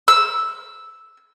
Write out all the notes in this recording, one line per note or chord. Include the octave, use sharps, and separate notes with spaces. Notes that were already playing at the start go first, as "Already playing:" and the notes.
E6